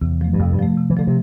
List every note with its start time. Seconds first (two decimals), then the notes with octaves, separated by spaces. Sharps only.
0.01 E2 C3
0.21 F3 A3
0.33 G2
0.39 F2 C3
0.52 G2
0.59 F3 A3
0.77 C3
0.90 E3
0.97 D3 F3 A3
1.07 C3